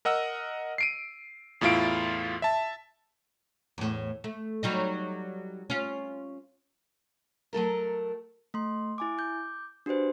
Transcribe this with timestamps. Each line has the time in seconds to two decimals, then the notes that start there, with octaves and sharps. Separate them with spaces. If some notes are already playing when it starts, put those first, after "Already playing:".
0.05 A#4 D#5 F#5 E6
0.78 C7 D7 D#7
1.61 E2 A2 E4 F4 F5 D7
2.42 E5 A5
3.78 E2 A2
4.24 A3
4.63 F#3 G3 D#4
5.70 C#4 F4
7.53 F#3 A3 A4 A#4
8.54 A3 C6
8.98 E4 G#5 D6
9.18 D6 G6
9.86 D4 F#4 G4 B4 C5